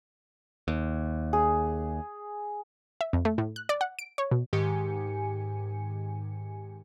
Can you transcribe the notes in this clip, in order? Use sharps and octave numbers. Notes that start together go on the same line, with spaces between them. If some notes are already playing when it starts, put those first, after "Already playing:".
D#2
G#4
E5
F2
A3
A2
F#6
D5
F#5
D7
C#5
B2
G#2 D#3 G4 G#5 C#7